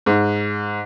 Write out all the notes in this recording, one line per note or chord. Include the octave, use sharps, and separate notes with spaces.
G#2